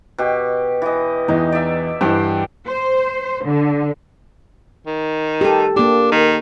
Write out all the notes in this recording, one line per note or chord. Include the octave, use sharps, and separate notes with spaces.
B2 G4
E3 D#5
E2 E3 D#4
D5 E5
G2 E3 C5 F#5 G5
C5
D3
D#3
G4 A4
A#3 D4 G4
D#3